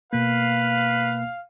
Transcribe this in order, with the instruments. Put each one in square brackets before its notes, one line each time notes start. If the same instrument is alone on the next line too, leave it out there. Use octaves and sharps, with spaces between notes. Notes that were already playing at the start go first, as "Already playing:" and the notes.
[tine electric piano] B2 A#3 [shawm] B4 [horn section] F5